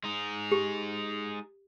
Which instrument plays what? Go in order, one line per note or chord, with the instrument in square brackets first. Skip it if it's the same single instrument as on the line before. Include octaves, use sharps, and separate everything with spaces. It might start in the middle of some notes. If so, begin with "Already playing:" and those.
[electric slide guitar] G#3 D#4
[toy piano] G4